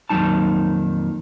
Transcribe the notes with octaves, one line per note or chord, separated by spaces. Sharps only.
F2 A#2 D#3 F#3 D#4 A5